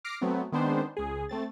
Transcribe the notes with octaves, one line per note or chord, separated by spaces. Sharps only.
D6 F6 A#6 C7 D7
F#3 A3 B3 C4
D#3 G#3 B3 C4 D4 C5
C#2 G#4
A3 C4 A6